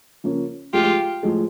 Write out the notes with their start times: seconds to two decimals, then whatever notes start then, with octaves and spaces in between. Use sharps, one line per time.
0.24 C#3 F3 A#3 C#4
0.73 A2 F3 G#3 F4 G4
1.23 A2 F3 G#3